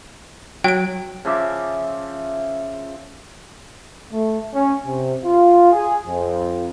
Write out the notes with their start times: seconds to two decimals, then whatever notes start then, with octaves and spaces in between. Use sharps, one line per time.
0.64 F#3 G5 D7
1.25 C#3 F3 E5 D6
4.11 A3
4.54 C#4
4.86 C3
5.24 F4
5.73 G#4
6.05 F2